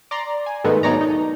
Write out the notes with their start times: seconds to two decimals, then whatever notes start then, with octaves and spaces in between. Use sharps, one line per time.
0.11 D5 A#5 C6
0.46 G#5
0.64 G#2 D#3 G#3 A3 B3
0.83 B1 B2 D#4 C#5 D5 A#5
1.01 D#4